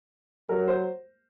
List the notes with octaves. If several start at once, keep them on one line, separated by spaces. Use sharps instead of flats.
F#3 A#4
C5